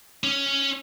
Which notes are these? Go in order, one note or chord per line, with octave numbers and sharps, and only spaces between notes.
C#4